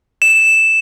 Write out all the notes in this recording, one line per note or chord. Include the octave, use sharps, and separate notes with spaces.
E7